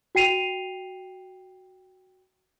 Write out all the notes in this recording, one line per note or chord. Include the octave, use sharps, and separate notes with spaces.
F#4 G5 C7 D#7 F7